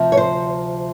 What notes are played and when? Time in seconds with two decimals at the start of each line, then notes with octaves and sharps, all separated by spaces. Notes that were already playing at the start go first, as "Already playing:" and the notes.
Already playing: D2 C3 F3
0.12 C#5
0.17 C5